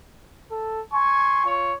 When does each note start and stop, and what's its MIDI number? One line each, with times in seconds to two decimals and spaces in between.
0.51 0.81 69
0.94 1.44 80
0.94 1.44 84
0.94 1.52 85
1.45 1.72 65
1.45 1.72 73